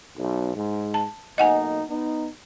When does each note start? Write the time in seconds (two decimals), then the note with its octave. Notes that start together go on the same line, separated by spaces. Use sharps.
0.17 B1
0.55 G#2
0.94 A5
1.38 B1 A#3 D#4 D#5 F#5 G#5
1.89 B3 D#4